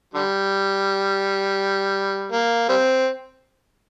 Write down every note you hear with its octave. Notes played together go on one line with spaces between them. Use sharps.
D3 G3
A#3
G3 C4